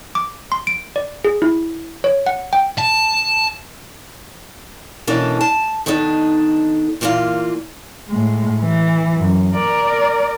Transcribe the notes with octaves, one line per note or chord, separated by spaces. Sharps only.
D6
C6
D7
D5
G#4
E4
C#5
F#5
G5
A5
B2 E3 A#3 C#4 D4 A4
A5
D#3 B3 D4 D#4 A4
A#2 E3 A#3 D#4 F4 F5
A2 G#3
E3
F#2
A#4 D5